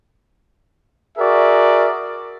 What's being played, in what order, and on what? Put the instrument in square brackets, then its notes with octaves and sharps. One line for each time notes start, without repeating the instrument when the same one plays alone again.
[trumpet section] F#4 G#4 A#4 D5 E5